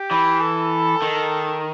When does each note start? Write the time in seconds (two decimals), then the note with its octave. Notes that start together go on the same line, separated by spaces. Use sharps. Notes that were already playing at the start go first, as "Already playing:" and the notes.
Already playing: G4
0.11 E3
0.41 A4
1.02 D#3